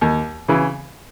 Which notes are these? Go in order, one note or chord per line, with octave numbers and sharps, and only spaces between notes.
D#2
C#3 E3